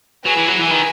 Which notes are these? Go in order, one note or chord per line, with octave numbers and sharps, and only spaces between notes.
F#3 G#4 B4 E5 G#5
E3
F#3
E3
D#3